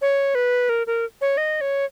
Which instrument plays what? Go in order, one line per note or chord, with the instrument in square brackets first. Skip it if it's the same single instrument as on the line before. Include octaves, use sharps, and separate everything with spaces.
[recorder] C#5
B4
A#4
A#4
C#5
D#5
C#5